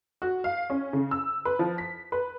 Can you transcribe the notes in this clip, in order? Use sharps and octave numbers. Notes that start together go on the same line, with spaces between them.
F#4
F5
C#4
C#3
E6
B4
F3
B6
B4